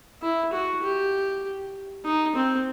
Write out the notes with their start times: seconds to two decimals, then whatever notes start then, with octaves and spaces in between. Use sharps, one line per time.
0.22 E4
0.53 F#4
0.83 G4
2.05 D#4
2.36 C4